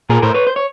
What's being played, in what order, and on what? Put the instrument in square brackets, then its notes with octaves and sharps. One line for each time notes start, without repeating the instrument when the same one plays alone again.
[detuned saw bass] A#2 [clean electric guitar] G#4 A#4
[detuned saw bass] A2 [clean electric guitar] A#4 C5
[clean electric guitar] B4 C#5
C5
C#5